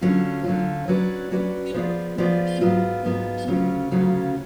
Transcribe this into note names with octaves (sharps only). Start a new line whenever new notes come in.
D3 F#3 C#4 F4
D3 F#3 C#4 F4
F#3 C#4 F#4 B4 D5
F#3 C#4 F#4 B4 D5
F3 B3 F4 G#4 D5
F3 B3 F4 G#4 D5
G#2 F#3 B3 F4
G#2 F#3 B3 F4
D2 C#3 F#3 C#4 F4
D2 C#3 F#3 C#4 F4